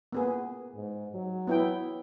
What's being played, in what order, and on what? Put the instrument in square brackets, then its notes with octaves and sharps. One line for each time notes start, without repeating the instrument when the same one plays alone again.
[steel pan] A#3 B3 G#4
[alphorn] G#2
F#3
[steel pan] B3 E4 G5